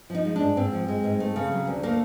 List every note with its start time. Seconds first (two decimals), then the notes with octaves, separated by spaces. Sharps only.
0.10 F3 D#4
0.25 G#3
0.36 D4
0.41 G#2
0.57 G#2 C4
0.73 F3
0.88 G#3
1.04 G#2
1.20 A3
1.36 C#3
1.52 F#3
1.67 D2
1.83 A3 A#3